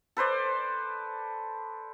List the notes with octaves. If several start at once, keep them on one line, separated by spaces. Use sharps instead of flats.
A4 B4 C5 D5